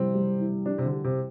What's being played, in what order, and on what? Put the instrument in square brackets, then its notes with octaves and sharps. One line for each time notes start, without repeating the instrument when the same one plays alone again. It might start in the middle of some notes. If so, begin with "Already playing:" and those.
Already playing: [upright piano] C3 G3 E4 [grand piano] C4
[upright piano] G3
E4
[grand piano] D4 [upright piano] G4
[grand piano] C3
D3
[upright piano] G4
[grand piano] C3